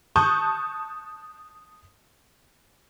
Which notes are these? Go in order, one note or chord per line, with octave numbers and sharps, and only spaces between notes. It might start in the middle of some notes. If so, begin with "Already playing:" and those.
A5 C#6 D#6 F#6 G6